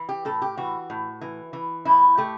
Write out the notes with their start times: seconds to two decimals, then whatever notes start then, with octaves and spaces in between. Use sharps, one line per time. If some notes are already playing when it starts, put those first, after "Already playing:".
Already playing: E3
0.09 G4
0.25 A2 A4
0.42 G4
0.57 E3 F#4
0.90 A2
1.21 E3
1.53 E3
1.85 A2 E4
2.17 A3 G4